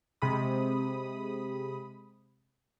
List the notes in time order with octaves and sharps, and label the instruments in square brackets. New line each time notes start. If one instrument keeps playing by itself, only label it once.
[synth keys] C3 G#3 B5 D#6